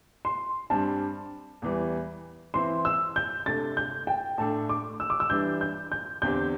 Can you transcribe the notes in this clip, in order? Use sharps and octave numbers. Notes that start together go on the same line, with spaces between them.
C6
G2 G3 C4 A5
E2 E3 G3
E3 C4 E4 C6
E6
G6
C3 A3 D4 A4 A6
G6
G5
A2 A3 D4 A4 A5
D6
E6
D6
E6
E3 G3 D4 G6
G6
G6
E2 D3 C4 G4 G6